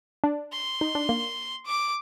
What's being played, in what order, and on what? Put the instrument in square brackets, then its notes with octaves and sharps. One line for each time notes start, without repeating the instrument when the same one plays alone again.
[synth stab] D4
[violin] C6
[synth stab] D#4
D4
A#3
[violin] D6